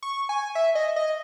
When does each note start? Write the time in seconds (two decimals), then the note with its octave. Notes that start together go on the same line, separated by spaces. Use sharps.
0.03 C#6
0.29 G#5
0.55 E5
0.75 D#5
0.96 D#5